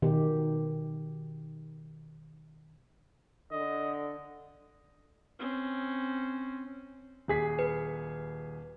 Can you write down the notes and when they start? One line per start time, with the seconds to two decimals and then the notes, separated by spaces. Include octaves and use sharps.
0.02 B2 D#3 G4
3.52 D3 D#5
5.39 C4 C#4
7.28 D#1 G#4 B6
7.59 B4